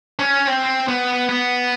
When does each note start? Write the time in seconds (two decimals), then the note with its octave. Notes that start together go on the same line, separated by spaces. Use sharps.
0.19 C#4
0.47 C4
0.88 B3
1.29 B3